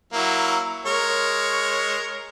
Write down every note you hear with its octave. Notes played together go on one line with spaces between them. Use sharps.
F#3 A#3 E4
G#3 A#4 C#5